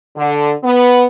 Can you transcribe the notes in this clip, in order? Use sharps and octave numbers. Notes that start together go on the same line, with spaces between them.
D3
B3